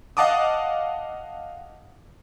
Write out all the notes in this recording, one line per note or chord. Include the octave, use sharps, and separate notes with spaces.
D#5 F5 F#5 A5 D6 D#6